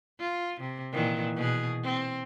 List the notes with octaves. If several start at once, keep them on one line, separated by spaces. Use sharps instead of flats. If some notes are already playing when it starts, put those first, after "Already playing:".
F4
C3
A#2 D#3 E3
B2 G#4
C4